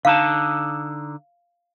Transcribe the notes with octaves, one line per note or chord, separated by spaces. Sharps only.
D3 D#4 F5 A5